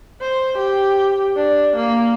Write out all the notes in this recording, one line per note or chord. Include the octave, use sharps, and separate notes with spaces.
C5
G4
D4
A#3